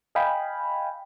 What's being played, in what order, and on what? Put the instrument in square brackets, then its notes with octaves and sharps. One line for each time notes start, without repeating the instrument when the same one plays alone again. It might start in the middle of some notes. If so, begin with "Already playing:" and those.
[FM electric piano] D#5 F5 G5 G#5 B5